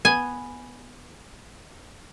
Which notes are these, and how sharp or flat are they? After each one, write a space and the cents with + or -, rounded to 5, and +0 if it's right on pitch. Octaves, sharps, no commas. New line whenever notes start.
B3 +0 G#5 +0